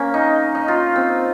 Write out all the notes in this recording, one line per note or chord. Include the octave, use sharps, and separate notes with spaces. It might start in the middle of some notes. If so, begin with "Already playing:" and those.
Already playing: A#3 C#4
D#4
D#4
F4
C4